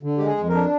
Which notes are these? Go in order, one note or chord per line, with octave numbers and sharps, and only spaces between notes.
D3
G#3 G4
G#4
F2
A#4
D4